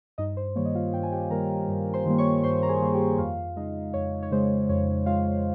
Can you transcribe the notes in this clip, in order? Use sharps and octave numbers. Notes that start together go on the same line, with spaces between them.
G2 D#4 D#5
C5
D#3 G3 A#3 C#5
D#5
F4 F5
G2 G5
G#5
G4 G5
D#3 G3 A#3 A#4 A#5
G2
C5 C6
D#3 G3 A#3
C#5 C#6
G2 C5 C6
A#5
G#4 G#5
D#3 G3 A#3
G4 G5
F2 F4 F5
C#3 G#3 D#4 D#5
F2 C#5
C#5
C#3 G#3 C5
F2 C#5
G#3 F4 F5